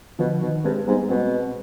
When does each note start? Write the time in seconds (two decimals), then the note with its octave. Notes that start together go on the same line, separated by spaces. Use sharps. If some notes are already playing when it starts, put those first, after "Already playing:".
0.19 B2 D3 F3
0.41 B2 D#3
0.64 G2 G#3 C4
0.87 G#2 G3 B3
1.09 B2 G#3 C4